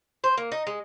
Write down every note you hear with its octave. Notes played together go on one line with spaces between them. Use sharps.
C5
A#3
D#4
G#3